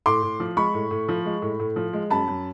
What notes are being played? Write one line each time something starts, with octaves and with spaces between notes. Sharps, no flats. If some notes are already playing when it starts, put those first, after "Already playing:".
A2 C6 D6
A2
F3
G#3 B5 C#6
A2
A2
F3
G#3
A2
A2
F3
G#3
F#2 A5 B5
F#2